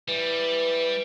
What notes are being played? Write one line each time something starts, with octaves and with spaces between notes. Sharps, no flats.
E3 G3